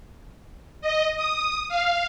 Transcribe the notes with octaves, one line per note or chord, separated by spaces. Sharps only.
D#5
D#6
F5